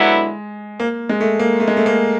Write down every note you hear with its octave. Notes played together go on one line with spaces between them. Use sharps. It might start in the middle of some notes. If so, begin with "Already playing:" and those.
Already playing: D3 F#3 G#3 B3 E4
A#3
G#3
A3
A#3
A3
G#3
A3
A#3